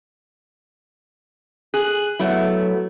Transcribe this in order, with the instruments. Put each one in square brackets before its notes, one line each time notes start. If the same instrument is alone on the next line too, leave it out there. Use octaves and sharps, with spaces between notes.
[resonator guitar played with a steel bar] G#4 [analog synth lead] F#6
[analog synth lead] F#3 [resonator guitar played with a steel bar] A3 B3 E4